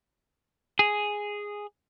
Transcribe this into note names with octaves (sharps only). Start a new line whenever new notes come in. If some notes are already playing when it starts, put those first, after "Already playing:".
G#4